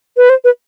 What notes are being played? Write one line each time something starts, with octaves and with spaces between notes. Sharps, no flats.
B4
C5
B4